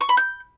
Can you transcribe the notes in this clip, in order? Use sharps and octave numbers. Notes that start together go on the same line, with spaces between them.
C#6
B5
G6